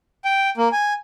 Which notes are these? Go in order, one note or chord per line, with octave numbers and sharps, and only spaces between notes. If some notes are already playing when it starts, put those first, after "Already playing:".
G5
A#3
G#5